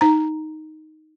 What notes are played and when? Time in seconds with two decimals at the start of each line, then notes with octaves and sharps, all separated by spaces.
0.01 D#4 A#5